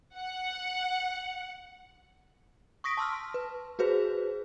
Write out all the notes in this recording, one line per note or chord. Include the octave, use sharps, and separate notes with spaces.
F#5
C#6 D#6 A#6 B6 D7
A5 C6 E6 F6
B4
F#4 G#4 B4 C5